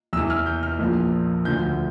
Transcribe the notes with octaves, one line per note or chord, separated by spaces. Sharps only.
E2 E3 E6
F6
G6
F6
A#1 A#2 F3
D2 D3 F3 G6